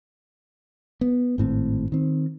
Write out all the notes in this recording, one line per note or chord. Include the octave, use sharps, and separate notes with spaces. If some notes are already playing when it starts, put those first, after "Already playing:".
B3
G#1 A2 C4
D#3 C4